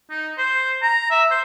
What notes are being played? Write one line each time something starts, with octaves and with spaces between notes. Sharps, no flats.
D#4
C5
A#5
E5
C5